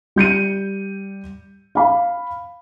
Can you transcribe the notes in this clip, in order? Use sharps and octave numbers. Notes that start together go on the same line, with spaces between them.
G3 G6 C#7 D#7
F5 B5